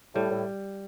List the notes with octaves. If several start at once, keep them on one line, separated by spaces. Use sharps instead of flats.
A2 G3
A2